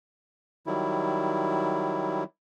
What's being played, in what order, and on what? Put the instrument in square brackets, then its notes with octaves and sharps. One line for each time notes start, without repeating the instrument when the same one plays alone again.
[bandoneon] D#3 F#3 G3 E4